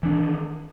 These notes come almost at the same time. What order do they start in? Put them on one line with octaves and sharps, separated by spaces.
E3 D4 D#3